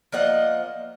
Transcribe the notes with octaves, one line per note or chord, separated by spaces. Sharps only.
F3 A#3 D#5 F#5